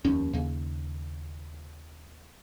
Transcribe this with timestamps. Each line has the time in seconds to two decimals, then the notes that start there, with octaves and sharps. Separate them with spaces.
0.04 F1 D#2 C#4
0.33 D#2 C#3